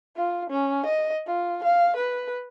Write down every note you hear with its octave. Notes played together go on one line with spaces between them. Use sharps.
F4
C#4
D#5
F4
F5
B4